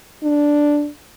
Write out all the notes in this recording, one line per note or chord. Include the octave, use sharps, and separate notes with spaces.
D4